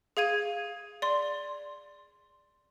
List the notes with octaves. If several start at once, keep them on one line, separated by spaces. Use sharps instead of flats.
G#4 F5 G#6 D#7
D5 C6